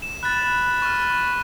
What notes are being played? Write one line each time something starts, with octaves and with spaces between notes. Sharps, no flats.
E7
B5 F#6 A6
C#6 F6